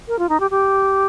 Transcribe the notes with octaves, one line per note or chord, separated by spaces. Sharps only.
A#4
F4
D#4
G4
G4